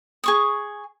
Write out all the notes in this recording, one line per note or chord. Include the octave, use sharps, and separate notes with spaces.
G#4 C#6 D#6